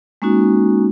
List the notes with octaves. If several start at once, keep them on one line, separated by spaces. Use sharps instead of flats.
G#3 A#3 C#4 D#4 F#4